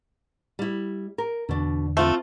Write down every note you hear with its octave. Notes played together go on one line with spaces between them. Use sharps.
G3 E4
A#4
E2 B2 D3 D4
A3 C4 F4 C5